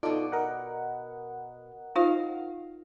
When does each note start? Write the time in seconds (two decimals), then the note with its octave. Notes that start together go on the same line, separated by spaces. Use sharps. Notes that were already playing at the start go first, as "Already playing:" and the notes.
0.03 B2 D#4 F4 A4 D5
0.32 A#4 D#5 F#5
1.96 D#4 F4 C5 F5